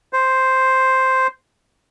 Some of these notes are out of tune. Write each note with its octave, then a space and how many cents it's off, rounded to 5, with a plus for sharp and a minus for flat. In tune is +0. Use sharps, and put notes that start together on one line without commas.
C5 +0